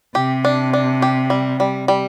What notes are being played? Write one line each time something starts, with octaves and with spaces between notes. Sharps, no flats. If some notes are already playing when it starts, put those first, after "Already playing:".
C3 G4
D4
D4
G4
G3
G3
G3